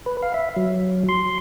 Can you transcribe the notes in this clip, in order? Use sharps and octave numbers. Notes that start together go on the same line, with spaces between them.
B4
F5
E5
F#3
C6